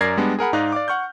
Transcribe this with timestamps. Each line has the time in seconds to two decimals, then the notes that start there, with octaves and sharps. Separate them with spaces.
0.01 F#2 A#4 D5 G#6 A#6 C7
0.17 G3 G#3 B3 D4
0.39 G#4 A#4 F#5 B5
0.53 G#2 D#4 D5 D#5 F5 F#6
0.72 D5 F5 D6
0.88 F#5 C#6 F6 G6